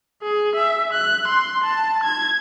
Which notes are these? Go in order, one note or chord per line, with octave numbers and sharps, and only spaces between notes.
G#4
E5
F#6
C6
A5
G#6